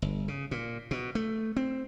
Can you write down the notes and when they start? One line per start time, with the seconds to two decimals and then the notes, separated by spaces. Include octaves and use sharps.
0.02 G1
0.28 C#3
0.51 A#2
0.91 B2
1.15 A3
1.57 C4